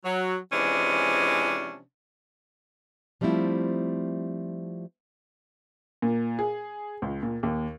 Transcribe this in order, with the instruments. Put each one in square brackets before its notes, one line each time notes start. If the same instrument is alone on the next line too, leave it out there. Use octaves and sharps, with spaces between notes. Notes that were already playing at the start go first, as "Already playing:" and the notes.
[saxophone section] F#3
C3 E3 F3 G#3 C#4 D4
[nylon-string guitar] F3 G3 A3 C4 E4 F4
[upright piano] A#2
G#4
C#2
A#2
D#2